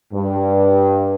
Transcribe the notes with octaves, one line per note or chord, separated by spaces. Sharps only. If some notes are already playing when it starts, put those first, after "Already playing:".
G2